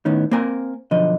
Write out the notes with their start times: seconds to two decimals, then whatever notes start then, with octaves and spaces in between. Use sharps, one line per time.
0.05 A2 D#3 B3 C#4 D#4
0.31 A#3 C4 A#4 G#5
0.91 B1 D3 F3 D#5